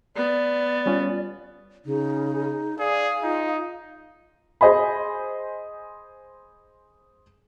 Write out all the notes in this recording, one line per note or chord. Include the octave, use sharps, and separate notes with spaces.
B3 D5
G3 C#4 F4
C#3 D#4
G#4 D5 F5
D#4 F4
G#4 C5 D#5 G#5 B5